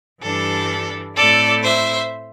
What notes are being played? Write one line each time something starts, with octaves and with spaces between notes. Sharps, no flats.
G2 E3 G3 D4 A4
A2 A3 C4 E4 A4 D5
C5 E5